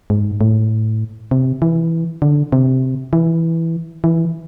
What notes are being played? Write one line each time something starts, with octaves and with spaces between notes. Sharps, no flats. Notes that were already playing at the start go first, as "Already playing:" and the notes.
G#2
A2
C3
E3
D3
C3
E3
E3